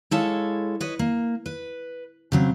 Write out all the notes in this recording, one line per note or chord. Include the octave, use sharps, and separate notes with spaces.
G#3 E4 A4 C#5 F5
B4 C#5 D#5
A#3
B4
C#3 F#3 C4